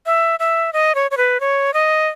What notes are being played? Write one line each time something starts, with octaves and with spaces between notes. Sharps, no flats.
E5
E5
D#5
C#5
C#5
B4
C#5
D#5